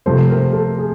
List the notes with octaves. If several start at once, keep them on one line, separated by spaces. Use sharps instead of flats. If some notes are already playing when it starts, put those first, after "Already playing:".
C3 F3 A3 C4 C5
A#4
A4
G#4